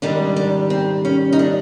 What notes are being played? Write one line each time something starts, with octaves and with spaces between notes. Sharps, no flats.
G#2 D#3 G3 D4
D4
C4
C#4
D#4
D4